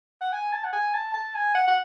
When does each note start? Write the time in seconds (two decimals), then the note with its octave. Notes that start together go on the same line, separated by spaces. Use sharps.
0.21 F#5
0.32 G#5
0.52 A5
0.64 F#5
0.73 G#5
0.94 A5
1.13 A5
1.35 G#5
1.55 F#5
1.67 F#5